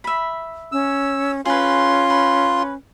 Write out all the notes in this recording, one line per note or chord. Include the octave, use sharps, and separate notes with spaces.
E5 B5
C#4 E6
C#4 F4 G#4 B4 C6
B4